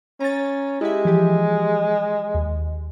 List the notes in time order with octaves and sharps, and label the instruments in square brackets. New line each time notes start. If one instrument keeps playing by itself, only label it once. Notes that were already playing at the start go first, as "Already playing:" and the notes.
[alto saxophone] C#4 [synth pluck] A#5 A6
[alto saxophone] G#3 [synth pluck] E4 G4 E5
[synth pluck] E3 F3 G4
D#2